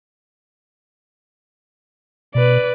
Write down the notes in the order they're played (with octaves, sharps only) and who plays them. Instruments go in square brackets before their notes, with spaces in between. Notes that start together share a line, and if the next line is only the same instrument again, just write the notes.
[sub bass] B2 [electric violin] B4 D5